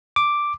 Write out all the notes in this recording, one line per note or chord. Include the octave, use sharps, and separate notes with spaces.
D6